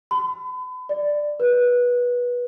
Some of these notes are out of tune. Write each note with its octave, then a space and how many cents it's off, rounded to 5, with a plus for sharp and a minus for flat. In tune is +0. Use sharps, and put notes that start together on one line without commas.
B5 +40
D5 +5
B4 -20